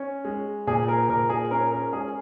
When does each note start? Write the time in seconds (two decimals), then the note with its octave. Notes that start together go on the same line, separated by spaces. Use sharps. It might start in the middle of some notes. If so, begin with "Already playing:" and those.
Already playing: C#4
0.25 G#3
0.67 A#2 G#4
0.88 A#4
1.09 A#2 A#4
1.29 G#4
1.51 C#4 A#4
1.72 A#4
1.93 G#3 G#4